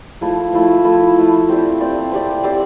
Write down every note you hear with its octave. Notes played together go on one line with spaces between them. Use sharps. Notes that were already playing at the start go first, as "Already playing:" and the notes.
F3 A3 E4 A4
F3 A3 E4 A4
F3 A3 E4 A4
F3 A3 E4 A4
C4 G4 D5
C4 G4 D5
C4 G4 D5
C4 G4 D5